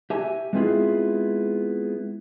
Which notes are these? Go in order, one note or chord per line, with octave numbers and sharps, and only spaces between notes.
G4 E5 G#5
G#3 B3 C4 E4 F4 G#4